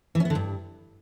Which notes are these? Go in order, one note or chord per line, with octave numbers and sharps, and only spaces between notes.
E3
C#4
B3
D3
G2